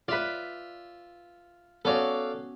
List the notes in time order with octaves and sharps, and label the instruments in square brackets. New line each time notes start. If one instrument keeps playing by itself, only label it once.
[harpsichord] F4 E5 [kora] B4 D5
[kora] B3 C#4 F#4 [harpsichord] A4 D5 F5